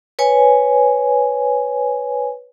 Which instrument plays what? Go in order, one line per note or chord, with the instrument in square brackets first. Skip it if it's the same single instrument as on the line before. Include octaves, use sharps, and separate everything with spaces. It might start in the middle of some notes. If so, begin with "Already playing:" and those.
[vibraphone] B4 C#5 G#5